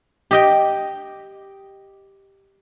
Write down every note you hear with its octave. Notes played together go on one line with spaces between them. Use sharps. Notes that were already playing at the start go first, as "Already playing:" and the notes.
G4 D#5 G5